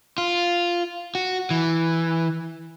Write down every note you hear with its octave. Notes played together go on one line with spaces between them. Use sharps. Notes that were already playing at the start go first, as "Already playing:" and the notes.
F4
F#4
E3